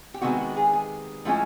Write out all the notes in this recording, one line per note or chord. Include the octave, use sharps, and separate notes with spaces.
G4
C3 D#3 G#3 B3 F#4
F#4
G#4
G#4
A2 F3 G#3 C#4